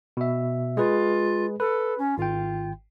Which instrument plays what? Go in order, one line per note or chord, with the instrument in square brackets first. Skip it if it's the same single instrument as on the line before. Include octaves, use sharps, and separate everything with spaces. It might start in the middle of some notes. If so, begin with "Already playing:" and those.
[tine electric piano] B2 E5
[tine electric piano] G#3 G#4 B4 [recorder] F4
[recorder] A4 [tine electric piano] B4
[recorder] C#4
[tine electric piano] G#1 G5 [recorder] F4